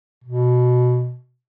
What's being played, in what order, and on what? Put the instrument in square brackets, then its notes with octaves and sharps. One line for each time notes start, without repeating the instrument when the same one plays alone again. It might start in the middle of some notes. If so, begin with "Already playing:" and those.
[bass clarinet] B2